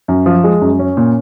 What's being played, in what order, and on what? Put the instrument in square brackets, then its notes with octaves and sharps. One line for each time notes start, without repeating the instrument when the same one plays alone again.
[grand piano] F#2
F3
G#3
F#2
C#4
A#2